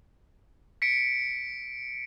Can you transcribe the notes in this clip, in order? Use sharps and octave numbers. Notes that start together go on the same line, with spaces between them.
B6 C#7 D7